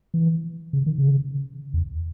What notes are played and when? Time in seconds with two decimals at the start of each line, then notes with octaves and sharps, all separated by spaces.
0.14 E3
0.73 C#3
0.86 D#3
0.98 C#3
1.74 E2